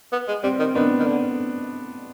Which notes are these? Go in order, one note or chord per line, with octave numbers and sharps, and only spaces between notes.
B3
G#3
G3 C4
D#3
D#3 B3 D4
D#3
D3